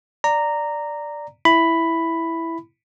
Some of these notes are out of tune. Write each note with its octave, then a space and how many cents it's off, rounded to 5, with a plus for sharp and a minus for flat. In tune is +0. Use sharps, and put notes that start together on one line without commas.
D5 +0 A#5 -10
E4 +0 B5 +5